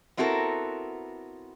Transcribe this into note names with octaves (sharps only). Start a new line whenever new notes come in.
B3 C4 E4 F#4 A4 A#4